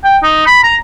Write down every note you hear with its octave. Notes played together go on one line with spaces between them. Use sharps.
G5
D#4
B5
A#5